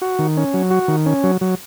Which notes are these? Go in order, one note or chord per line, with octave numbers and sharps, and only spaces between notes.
F#4
D#3
C#4
F#3
F#4
D#3
C#4
F#3
F#3